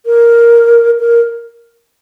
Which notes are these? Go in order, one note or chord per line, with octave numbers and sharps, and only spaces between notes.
A#4
A#4